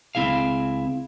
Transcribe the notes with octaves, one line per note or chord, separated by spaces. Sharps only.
C#2 C4 E4 G#4 F5